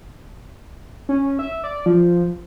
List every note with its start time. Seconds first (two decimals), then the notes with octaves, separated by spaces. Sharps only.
1.09 C#4
1.39 E5
1.64 D5
1.86 F3